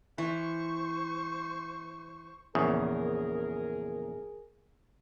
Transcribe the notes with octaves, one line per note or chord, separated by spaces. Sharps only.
E3 C5 C#6
A#1 E2 C#3 G#4 A#4